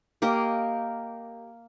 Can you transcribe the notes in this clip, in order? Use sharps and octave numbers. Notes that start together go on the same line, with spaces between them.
A#3 G4 A#4 D#5